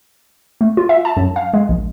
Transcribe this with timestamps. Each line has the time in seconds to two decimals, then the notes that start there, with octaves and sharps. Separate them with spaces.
0.61 A3
0.77 F4
0.89 E5
1.05 A5
1.17 F#2
1.36 F5
1.54 G#3
1.69 A#1